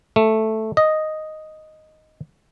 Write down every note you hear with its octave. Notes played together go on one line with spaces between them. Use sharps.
A3
D#5